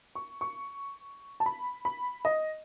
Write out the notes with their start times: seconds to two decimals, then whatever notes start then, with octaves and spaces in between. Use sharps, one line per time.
0.15 C#6
0.41 C#6
1.40 A5
1.46 B5
1.85 B5
2.25 D#5